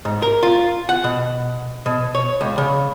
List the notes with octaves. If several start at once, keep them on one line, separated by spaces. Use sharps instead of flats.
G#2
A#4
F4
F#5
B2
B2
C#5
C#2
C#3